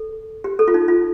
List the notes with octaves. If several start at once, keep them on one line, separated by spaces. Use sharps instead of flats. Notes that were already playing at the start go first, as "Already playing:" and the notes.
Already playing: A4
G4
A4
F4
D#4
F4